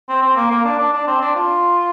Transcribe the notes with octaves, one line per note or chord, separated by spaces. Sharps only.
C4
C4
A#3
A#3
D4
D4
D4
C4
D4
F4